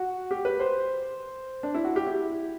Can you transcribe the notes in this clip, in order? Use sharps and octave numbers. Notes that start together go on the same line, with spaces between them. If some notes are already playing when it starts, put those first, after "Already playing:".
Already playing: F#4
G4
B4
C5
D4
E4
F#4
G4
E4